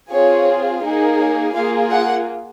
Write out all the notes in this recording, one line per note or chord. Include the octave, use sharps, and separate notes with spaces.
C4 F4 G#4 C#5
A#3 D#4 G#4
C#5
A#3 F4 G#4 F5
F#5